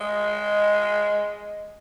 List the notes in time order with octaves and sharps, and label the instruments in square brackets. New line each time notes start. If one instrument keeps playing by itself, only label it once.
[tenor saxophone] G#3 [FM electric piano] D#5